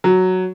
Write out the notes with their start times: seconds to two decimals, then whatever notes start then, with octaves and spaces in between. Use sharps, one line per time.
0.04 F#3